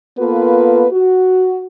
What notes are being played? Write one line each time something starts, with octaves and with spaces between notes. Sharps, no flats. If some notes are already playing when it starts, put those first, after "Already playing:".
A#3 B3 F4 A4 B4
F#4